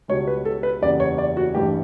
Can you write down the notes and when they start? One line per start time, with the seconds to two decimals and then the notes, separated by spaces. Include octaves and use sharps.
0.08 C#2 B2 G3 C#5
0.27 B4
0.45 A4
0.63 B4
0.82 F#1 E2 C#3 G3 D5
1.00 C#5
1.18 D5
1.37 F#4
1.55 A1 G2 E3 G4